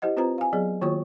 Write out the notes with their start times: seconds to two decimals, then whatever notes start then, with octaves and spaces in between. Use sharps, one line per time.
0.02 E4 G4 C5 D#5 F#5
0.17 C4 F4 B4 C5 A#5
0.38 F5 G#5
0.53 F#3 B3 G#4 D5
0.81 D#3 A#3 F4 F#4 C#5 C#6